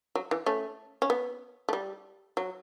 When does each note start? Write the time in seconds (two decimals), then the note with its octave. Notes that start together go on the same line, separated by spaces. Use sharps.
0.15 F#3
0.31 E3
0.46 A3 C#4
1.02 C#4
1.10 B3
1.69 A3
1.73 G3
2.37 F#3